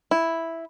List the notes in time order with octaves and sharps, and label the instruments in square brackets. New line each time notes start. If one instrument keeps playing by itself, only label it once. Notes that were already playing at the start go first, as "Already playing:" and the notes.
[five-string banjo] E4